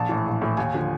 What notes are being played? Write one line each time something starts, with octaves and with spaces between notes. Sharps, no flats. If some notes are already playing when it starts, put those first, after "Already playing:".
Already playing: A#1 A5
A2 E3
A#1
A2 E3
D#2 G#5
D3 F3